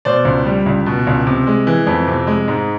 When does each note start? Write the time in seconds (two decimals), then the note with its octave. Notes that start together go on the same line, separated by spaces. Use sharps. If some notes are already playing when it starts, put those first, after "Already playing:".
0.05 B2 C5 D5
0.25 C#2
0.46 G3
0.66 C#2
0.86 B2
1.07 C#2
1.27 C3
1.47 G#3
1.67 E3
1.87 F2
2.08 C3
2.27 G#3
2.48 G#2